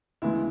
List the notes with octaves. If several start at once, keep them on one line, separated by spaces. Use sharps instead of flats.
D2 C#3 E3 G#3 B3 E4